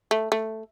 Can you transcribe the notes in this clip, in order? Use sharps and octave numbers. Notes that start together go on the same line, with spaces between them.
A3
A3